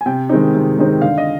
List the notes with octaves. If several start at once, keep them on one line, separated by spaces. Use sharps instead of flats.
G#5
C3 G5
D#3 G#3 C4 D#4
C3
D#3 G#3 C4 D#4
D3 F5
D#5